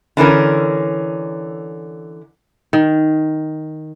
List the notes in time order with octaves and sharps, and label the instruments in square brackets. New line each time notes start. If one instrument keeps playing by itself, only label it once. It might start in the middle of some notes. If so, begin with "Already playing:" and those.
[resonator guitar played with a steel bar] D3 E3 C#4 A#4
[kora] D#3